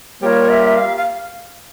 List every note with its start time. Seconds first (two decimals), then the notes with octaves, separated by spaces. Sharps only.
0.22 G3 A#3 F4 A#4 C#5
0.49 E5
0.76 F5
0.96 F5